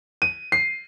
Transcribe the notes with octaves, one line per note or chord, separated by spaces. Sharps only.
D#7
C7